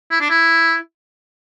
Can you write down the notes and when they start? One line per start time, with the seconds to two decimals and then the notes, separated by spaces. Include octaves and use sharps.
0.11 E4
0.21 D4
0.30 E4